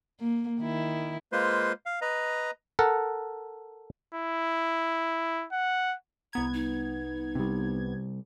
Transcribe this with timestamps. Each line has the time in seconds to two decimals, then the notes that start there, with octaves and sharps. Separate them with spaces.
0.20 A#3
0.61 D#3 E4
1.32 G#3 A#3 F4 B4 C5 C6
1.86 F5
2.01 B4 D#5 A#5
2.79 A4 A#4 F#5
4.15 E4
5.52 F#5
6.33 C2 B3 A#5 G#6
6.53 D#4
7.35 C3 G3